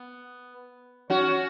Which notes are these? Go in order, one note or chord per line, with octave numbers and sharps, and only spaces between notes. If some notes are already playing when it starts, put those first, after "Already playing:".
Already playing: B3
C#4 F#4